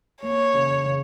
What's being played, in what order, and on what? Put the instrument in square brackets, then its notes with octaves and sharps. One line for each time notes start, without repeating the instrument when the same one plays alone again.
[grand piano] A#3 [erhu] C#5
[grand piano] C#3
C#3